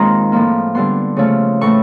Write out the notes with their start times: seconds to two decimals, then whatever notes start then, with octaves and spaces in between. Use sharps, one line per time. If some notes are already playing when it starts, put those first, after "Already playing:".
Already playing: D#2 D#3 G#3 C4 F4 A#5 C6
0.32 A2 F3 A#3
0.75 D3 G3 B3 C6
1.16 C#3 F3 A3 C#4
1.61 A2 E3 A3 C#6